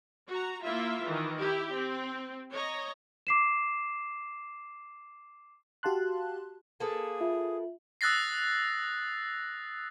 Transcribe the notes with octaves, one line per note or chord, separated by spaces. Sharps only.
F#4 A#5
A#3 E4 F4 E5
D#3 E3
E4 G4
C4
C#5 D#5 A#5
D6 C7 E7
F#4 G4 F5 A5 C6 F#6
A#3 G#4 A4 B4
F4 E5
D#6 E6 F#6 A6 A#6 C7